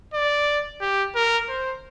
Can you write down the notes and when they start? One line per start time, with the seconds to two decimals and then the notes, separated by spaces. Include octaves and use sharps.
0.13 D5
0.81 G4
1.15 A#4
1.49 C5